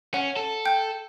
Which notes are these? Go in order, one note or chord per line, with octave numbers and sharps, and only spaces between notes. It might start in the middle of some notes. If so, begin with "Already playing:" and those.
C#4 F#5
A4
G5 G6